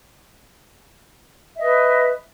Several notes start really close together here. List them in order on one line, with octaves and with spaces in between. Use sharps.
E5 D#5 B4